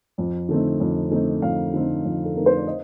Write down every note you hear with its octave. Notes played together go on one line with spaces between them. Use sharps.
F2
D3 A3 C4 D#4
F2
D3 A3 C4 D#4
F2 F5
D3 A3 C4 D#4
F2
A4
D3 A3 C4 D#4 A#4
C5
D5
D#5